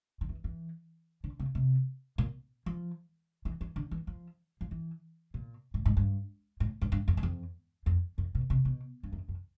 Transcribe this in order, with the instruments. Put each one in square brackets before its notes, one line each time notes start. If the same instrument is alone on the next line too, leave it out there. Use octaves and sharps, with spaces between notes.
[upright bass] D#3
E3
E3
D3
C#3
C3
A#2
F3
E3
E3
D3
E3
F3
F3
E3
A#2
A2
G#2
G2
A2
G2
G2
F2
F#2
F2
F2
F#2
B2
C3
B2
G2
F#2
F#2